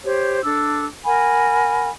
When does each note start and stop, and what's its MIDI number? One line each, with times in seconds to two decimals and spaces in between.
0.04 0.39 67
0.04 0.39 72
0.04 0.39 73
0.43 0.86 62
0.43 0.86 69
0.43 0.86 86
0.43 0.86 88
1.05 1.88 70
1.05 1.88 78
1.05 1.88 80
1.05 1.88 83